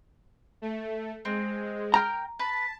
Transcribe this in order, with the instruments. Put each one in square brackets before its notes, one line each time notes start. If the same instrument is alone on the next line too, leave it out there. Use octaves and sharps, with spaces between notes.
[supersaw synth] A3
[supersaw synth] G#3 [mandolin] C4
[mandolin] A#4 G5 F6 [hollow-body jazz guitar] A#5
[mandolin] B4 [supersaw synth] A5